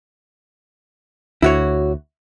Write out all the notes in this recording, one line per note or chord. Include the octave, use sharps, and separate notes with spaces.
D2 E4 F#4 C#5